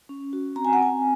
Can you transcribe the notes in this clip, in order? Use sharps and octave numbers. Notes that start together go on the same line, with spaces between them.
C#4
F#4
C4 A#5
G#5
F#5
C4 G#5